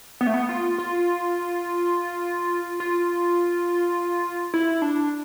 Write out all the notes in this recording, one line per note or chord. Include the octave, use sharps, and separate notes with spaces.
B3
A3
B3
F4
F4
F4
E4
D4